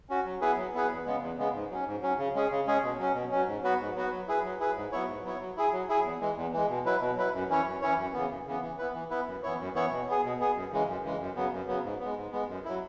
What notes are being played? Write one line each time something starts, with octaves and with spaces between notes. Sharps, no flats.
C#4 F#4
F#3
B3 E4 G#4 B4
F#3
B3 E4 G#4 B4
E2
C#3 G#3 B3
E2
C#3 G#3 B3
G#2
F#3 C#4
G#2
F#3 C#4
C#3
G#3 C#4 G#4
C#3
G#3 C#4 G#4
B2
F#3 C#4
B2
F#3 C#4
G#2
F#3 B3 F#4 B4
G#2
F#3 B3 F#4 B4
F#3
E4 G#4 B4
F#3
E4 G#4 B4
G#2
F#3 B3 E4 C#5
G#2
F#3 B3 E4 C#5
F#3
E4 G#4
F#3
E4 G#4
E2
E3 G#3
E2
E3 G#3
B2
F#3 E4 B4
B2
F#3 E4 B4
F#2
E3 C#4 E4 C#5
F#2
E3 C#4 E4 C#5
F#2
C#3 E3 B3
F#2
C#3 E3 B3
E3
B3 E4 B4
E3
B3 E4 B4
F#2
E3 B3 E4 C#5
F#2
E3 B3 E4 C#5
B2
B3 G#4
B2
B3 G#4
F#2
C#3 E3 G#3
F#2
C#3 E3 G#3
F#2
C#3 F#3 B3
F#2
C#3 F#3 B3
G#2
G#3 B3
G#2
G#3 B3
F#2
F#3 E4